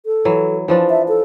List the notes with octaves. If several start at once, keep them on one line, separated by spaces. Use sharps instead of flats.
A4
E3 F#3
E3 F3 D4
E5
A4